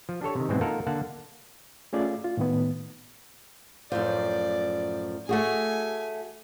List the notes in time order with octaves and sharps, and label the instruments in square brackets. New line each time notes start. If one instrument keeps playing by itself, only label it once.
[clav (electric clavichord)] F3
D4 G4 A4 C#5
C3 D#3
G#2 B2 E3 F#3 G#3 C4
A#3 D#4 F4 A4 A#4 F#5
D3 A#3 F#5 A5
[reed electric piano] A3 C#4 F4 G#4 D5
F4
A2 D#3 B3
[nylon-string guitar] F#2 A2 F3 [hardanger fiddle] D5
[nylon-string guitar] A3 F#4 G#4 [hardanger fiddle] G#5